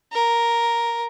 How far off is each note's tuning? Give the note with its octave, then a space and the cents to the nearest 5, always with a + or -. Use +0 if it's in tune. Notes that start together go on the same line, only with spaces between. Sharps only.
A#4 +5